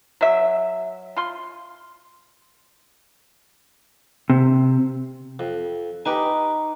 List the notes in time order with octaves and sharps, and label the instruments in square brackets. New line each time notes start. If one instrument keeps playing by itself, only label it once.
[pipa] F#3 E5
F4 C6
[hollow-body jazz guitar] C3
[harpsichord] F2
[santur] D#4 [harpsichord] G4 B4 G#5